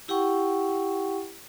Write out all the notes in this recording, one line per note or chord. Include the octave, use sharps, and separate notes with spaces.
E4 G4 F#5 G5 C#6